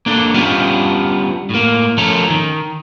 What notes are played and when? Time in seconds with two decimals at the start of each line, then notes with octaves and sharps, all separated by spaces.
0.06 A#3 D4 A4
0.34 G3 B3 C#4 D4 F4 G4
1.50 A2 A#3
1.98 F3 A3 C#4 A4 A#4
2.30 D#3